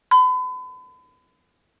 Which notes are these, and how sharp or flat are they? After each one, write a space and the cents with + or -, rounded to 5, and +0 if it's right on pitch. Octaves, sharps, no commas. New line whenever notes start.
B5 +40